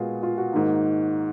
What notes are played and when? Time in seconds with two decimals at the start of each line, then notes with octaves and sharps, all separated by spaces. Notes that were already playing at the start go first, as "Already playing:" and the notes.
Already playing: A#2 G#3 B3 F4 F#4 G#4
0.23 F4
0.38 F#4
0.52 G#2 D#3 A#3